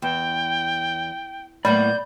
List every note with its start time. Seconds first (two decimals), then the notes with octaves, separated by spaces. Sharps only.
0.02 E2 G5
1.65 A2 A#3 B3 D5 B5 G6